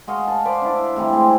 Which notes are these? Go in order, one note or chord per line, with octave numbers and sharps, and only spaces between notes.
G#3 F#4 D#5 F5
A5
B4 C5 D5 F5
D4 E4
A2 C3 E3 G3
G#3 C4 G#4